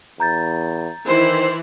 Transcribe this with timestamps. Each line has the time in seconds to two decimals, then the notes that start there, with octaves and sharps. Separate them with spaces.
0.20 E2 A#5 G6 A6
1.07 D#3 E3 E4 C5